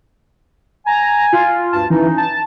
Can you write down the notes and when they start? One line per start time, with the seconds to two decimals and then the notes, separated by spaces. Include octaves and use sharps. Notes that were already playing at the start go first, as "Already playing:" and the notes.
0.87 G#5 A#5
1.33 F4
1.72 D2 G2 A5
1.90 E3 C#4 D#4
2.17 A5